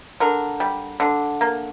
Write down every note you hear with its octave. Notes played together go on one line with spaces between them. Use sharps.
D3 A#4
G3
D3
A#3